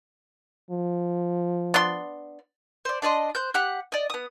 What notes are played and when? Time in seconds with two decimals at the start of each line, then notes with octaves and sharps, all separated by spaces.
0.71 F3
1.74 B3 D4 C6
2.85 C5 D5
3.02 D4 D5 D#5 C6
3.35 C5 F#6 G6
3.54 G4 F#5 F#6
3.92 D5 D#5
4.10 B3 D#6